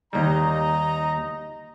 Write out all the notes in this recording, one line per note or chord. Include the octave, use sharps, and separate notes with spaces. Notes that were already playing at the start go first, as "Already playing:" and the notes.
D#2 G3 D#4 D#5 A#5